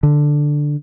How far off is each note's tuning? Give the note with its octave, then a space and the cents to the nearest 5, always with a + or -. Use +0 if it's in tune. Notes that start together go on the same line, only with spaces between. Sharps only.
D3 +5